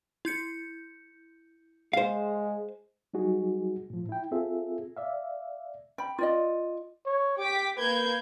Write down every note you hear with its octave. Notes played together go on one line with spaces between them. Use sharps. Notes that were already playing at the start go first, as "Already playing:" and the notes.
E4 G6 C#7
G#3 C5 F5
F#3 G3 D#4 F#4 G#4
A2 F3
E4 G5
C4 F4 G#4 A4 E5
D5 E5 F5
G5 B5
F4 D5 D#5
C#5
G4 G5 D6 B6
A#3 B4 G6 G#6